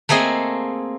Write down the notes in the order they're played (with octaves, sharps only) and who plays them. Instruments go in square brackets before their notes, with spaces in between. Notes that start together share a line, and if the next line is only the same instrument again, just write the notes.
[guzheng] A3 A#3 C4 G#4 D#5